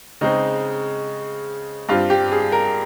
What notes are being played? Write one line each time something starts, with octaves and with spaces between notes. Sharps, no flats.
C#3 G#3 C4 D#4
G2 G3 C4 F4
G4
G#4
A#4